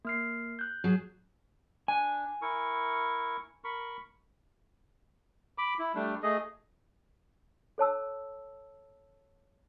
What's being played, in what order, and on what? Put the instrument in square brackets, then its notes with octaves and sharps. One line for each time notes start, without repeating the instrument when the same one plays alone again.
[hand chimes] A#3 F6 C7
F#6 G6
[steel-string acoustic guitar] F#3 G#4
[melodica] D4 [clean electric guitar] G#5
[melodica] E4 A#4 C#6
A#4 B5 C#6
B5 D6
E4
G3 A3 D4
A3 G#4 D#5
[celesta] A4 C#5 A5 E6